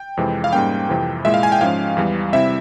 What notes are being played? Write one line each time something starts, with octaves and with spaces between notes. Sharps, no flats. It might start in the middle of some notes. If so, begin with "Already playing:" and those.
Already playing: G5
F2 C3 E3 G#3
F5
G#2 G3 A#3 C#4 G5
F2 C3 E3
A#2 G#3 E4 E5
F5
G#5
G5
G#2 F3 G#3 C#4 F5
E2 E3 G3
C3 G3 C4 E4 E5